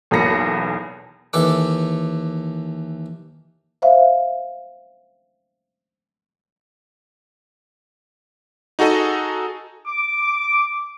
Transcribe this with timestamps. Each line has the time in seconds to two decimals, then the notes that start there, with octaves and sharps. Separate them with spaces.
0.11 B1 E2 A#3 B5 A#6 C#7
1.33 D#2 E3 A4 D6
3.82 C5 E5 F5
8.79 D#4 F#4 G#4 A4 D#5
9.86 D6